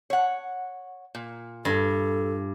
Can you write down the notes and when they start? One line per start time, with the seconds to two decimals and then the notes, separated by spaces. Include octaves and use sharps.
0.10 C#5 F#5
1.15 A#2
1.65 G2 A4